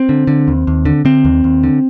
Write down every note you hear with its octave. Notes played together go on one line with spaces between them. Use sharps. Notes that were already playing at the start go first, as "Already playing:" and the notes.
Already playing: C4
D3
D3
D#2
D#2
D3
D3 C4
D#2
D#2
D3